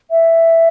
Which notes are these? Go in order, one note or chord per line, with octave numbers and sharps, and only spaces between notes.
E5